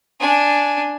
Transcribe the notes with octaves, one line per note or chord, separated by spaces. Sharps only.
D4 G#5